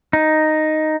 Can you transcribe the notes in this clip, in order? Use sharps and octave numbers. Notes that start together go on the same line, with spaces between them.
D#4